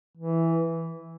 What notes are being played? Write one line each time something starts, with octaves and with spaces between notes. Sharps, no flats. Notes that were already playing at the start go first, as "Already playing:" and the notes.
E3